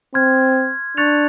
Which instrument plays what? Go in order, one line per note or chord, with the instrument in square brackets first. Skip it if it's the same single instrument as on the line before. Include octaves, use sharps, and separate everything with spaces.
[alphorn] C4 [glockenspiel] C6 F6 G#6
[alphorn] D4 [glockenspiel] C#6 F#6 A6 C#7 F7